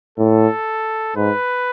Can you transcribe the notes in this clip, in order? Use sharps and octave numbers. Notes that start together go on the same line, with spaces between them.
A2 A4
G#2 B4